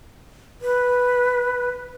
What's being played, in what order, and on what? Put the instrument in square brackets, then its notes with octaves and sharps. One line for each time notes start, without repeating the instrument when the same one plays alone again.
[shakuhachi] B4